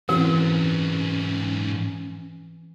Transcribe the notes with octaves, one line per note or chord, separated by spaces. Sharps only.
G#2 E3 F#3 C4 C#4 F#4 A#4